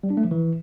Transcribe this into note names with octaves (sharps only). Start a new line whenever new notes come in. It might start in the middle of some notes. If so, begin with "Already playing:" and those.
G3
D4
A3
F3
E3